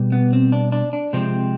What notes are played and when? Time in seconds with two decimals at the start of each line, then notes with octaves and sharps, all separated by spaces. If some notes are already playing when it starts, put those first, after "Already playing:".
Already playing: B2 G3
0.12 B3
0.33 C4
0.52 D4
0.72 D4
0.93 D4
1.13 C3 F3 G#3 C4